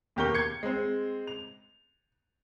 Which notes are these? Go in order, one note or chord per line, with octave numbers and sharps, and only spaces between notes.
D#2 B2 G4 A#4 C#6 G7
G#6 C#7
G#3 C4
F7